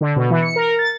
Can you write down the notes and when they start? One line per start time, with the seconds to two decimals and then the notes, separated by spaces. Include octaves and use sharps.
0.01 D3
0.16 B2
0.30 E3
0.42 C#7
0.56 A#4
0.79 A6